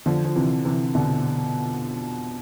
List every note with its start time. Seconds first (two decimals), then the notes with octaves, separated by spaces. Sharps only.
0.06 D3 F3
0.25 F3
0.36 C3 E3
0.65 C3 E3
0.95 B2 D3